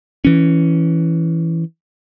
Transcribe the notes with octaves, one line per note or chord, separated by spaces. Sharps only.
E3 C#4